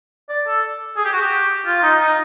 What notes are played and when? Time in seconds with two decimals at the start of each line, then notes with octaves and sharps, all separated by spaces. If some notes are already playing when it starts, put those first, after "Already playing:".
0.29 D5
0.47 A4
0.97 G#4
1.05 G4
1.13 F#4
1.21 G4
1.66 F4
1.83 D#4
2.00 D#4